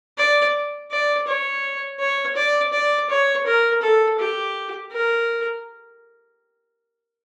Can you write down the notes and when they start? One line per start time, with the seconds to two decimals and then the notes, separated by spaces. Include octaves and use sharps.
0.18 D5
0.91 D5
1.27 C#5
1.99 C#5
2.36 D5
2.73 D5
3.10 C#5
3.46 A#4
3.82 A4
4.19 G4
4.92 A#4